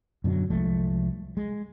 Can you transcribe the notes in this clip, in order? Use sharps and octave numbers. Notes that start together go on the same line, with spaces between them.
F#2 B2 D3 F#3
C2 F3 G#3 A3
G#3